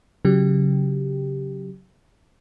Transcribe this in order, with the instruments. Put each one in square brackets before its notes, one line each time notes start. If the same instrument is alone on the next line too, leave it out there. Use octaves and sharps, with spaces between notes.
[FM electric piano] C#3 F#3 G4